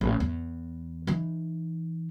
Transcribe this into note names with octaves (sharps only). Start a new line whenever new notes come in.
A1
E2
E3 D#4